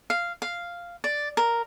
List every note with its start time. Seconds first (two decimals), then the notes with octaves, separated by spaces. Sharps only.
0.10 F5
0.42 F5
1.04 D5
1.37 A#4